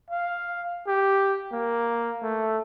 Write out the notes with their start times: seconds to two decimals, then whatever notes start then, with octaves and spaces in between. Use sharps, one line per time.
0.11 F5
0.88 G4
1.52 A#3
2.22 A3